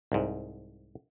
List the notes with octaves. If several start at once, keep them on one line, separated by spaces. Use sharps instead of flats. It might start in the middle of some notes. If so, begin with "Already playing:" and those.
C2 G#2